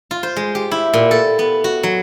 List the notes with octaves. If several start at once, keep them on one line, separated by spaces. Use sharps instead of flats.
F4
C5
G#3
G4
E4
A#2
A4
B3
F#4
F#3